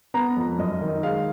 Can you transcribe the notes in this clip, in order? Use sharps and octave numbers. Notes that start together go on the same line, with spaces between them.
B3 A#5
F2
F#2 D#5
D#3
G#3 F5